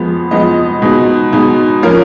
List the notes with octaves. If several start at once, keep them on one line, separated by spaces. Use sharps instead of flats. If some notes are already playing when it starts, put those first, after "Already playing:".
Already playing: F2 F3 G#3 B3
F2 F3 G#3 B3 D#5
B2 G#3 B3 D#4
B2 G#3 B3 D#4
F3 A#3 C#4 A#4